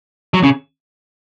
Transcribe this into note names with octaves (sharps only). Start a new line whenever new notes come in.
F#3
C#3